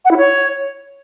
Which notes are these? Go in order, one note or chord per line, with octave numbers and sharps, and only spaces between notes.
F#5
E4
C#5